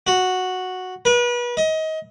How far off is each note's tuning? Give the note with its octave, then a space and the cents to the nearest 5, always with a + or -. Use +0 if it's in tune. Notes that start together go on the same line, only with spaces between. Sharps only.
F#4 -5
B4 -35
D#5 +25